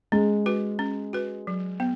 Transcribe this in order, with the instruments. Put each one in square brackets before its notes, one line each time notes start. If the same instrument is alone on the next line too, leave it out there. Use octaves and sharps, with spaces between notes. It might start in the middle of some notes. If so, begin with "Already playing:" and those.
[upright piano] G#3 [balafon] C#4
[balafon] F#4 B4
C#4
F#4 B4
F#3
B3